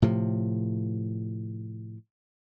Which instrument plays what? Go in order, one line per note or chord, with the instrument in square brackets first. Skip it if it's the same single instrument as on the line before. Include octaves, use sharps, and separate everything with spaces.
[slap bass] A2 C3 F3